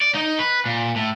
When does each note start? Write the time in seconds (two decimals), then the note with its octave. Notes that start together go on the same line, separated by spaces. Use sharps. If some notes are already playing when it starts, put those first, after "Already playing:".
0.01 D5
0.15 D#4
0.39 B4
0.66 A#2
0.96 A2